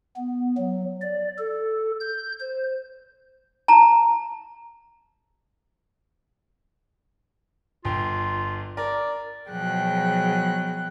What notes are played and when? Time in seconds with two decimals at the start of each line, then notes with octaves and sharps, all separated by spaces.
0.17 B3
0.57 F#3
1.01 D5
1.38 A4
2.00 G6
2.40 C5
3.68 A5 A#5
7.85 G1 F4 G5
8.77 A#4 D5
9.51 B2 F3 F#3 G#4 G5 F#6